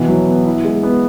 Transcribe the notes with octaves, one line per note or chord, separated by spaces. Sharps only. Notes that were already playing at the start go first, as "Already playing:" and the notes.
Already playing: B2 E3
F#3
B3
E4
G#3
B3